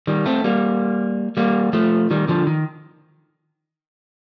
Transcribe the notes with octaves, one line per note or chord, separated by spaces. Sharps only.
D#3 G3
A3 C4
G3 A#3
G3 A#3
F3 A3
D#3 G3
D3 F3
D#3